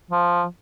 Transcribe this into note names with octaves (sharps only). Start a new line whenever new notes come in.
F3